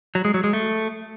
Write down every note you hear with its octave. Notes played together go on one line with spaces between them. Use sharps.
F#3
G#3
F#3
G#3
A3